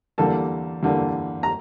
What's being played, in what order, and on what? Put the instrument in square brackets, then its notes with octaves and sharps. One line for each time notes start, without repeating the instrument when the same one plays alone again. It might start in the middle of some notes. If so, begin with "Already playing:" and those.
[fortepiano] E2 D3 G3 A#3 A4 A5
E2 D3 G3 A#3
A#5